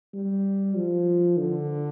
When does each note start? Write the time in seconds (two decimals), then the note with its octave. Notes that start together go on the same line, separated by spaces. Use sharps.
0.13 G3
0.76 F3
1.37 D3